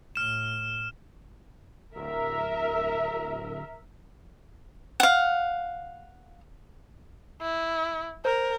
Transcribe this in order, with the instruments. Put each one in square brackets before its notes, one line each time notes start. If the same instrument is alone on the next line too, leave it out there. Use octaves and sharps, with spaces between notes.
[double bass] A2 [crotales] F6 E7
[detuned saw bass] D1 [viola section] A#4 E5
[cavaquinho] F5 F#5
[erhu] E4
[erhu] A#4 [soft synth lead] C5